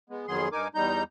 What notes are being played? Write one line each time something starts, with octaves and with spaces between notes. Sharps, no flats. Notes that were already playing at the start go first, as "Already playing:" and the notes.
G#3 B3
F2 D#3 F#3 B3 G#4 C6
G2 D#4 A#4 G#5 D6
E2 G3 D#4 A#5 G6